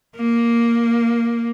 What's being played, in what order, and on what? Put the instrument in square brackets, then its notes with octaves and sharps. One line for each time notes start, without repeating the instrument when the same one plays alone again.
[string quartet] A#3